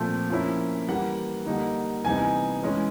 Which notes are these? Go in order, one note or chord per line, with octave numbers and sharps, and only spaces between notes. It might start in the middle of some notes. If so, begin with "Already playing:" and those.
Already playing: A#2 F3 A3 C4
F3 A#3 C#4 E4
E3 G3 A#3 F#5
D3 G3 A#3 D#4
C3 E3 G3 B3 D#4 G#5
E3 G#3 C#4